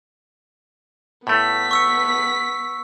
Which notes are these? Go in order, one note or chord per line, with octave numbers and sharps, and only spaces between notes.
A2 A3 B3 B6
C#6 E6 C#7